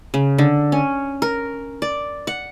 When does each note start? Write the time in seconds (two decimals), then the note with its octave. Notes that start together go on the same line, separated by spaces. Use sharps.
0.14 C#3
0.38 D3
0.72 C#4
1.22 A#4
1.82 D5
2.27 F#5